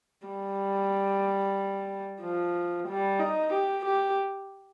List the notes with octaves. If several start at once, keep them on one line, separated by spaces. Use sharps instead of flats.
G3
F3
G3
D#4
G4
G4